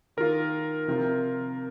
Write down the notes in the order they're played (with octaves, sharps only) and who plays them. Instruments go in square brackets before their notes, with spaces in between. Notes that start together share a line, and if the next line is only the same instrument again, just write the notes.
[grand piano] D#3 A#3 F4 [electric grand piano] A#4
[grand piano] C3 F3 C4 F4